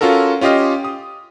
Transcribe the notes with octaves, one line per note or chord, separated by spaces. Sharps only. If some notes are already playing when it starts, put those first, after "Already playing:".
C#4 F4 F#4 A4 A#4
C#4 F4 G4 D#5 F5
D#6